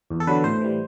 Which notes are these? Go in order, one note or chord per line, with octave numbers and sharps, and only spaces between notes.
E2
A4
D3 F#3 B4
A2 C5
E3 G3